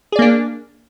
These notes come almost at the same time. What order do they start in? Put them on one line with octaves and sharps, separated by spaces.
G#4 D5 A#3 D4